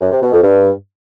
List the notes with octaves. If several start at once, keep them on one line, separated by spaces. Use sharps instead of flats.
F#2
C3
B2
F2
G2